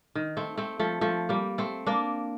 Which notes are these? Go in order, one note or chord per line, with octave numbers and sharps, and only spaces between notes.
D#3
A3 C4
A3 C4
F3 A3
F3 A3
G3 A#3
A3 C4
A#3 D4